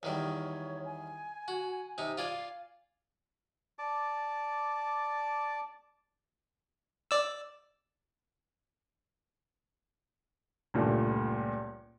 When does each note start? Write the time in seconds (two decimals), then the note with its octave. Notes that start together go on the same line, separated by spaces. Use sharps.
0.03 E2 D#3 G3 C#5
0.85 G#5
1.48 F#4
1.98 C3 D#4
2.18 F4 D5 F5 G#5
3.79 D5 A5 D6
7.11 D5 E6
10.74 C#2 G2 A#2 A3